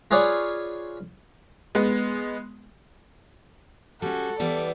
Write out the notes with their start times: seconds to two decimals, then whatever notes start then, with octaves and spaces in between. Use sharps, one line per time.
0.11 F4 G#4 B4 C#5 D5
1.75 G#3 B3
4.02 G3 C#4 F#4 A4
4.40 E3 G3 B3 D5